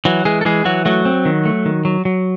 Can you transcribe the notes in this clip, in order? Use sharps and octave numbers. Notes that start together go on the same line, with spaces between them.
E3 F#3 F#4
E3 G#3 G#4
A4
E3 G#3 G#4
E3 F#3 F#4
F#3 A3 F#4
C4
D#3
A3
D#3
F#3
F#3